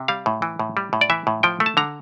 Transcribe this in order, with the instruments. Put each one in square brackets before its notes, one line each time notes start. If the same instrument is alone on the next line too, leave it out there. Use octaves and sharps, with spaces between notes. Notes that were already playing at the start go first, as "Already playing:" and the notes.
Already playing: [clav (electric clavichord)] C3
G3 F5
A2
E3
A2
G3
A2
D5
E3 E5
A2
F3 G5
A3
A5
D3 A#5